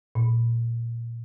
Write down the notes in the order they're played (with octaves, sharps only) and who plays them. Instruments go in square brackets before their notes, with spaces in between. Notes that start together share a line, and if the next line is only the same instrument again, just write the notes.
[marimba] A#2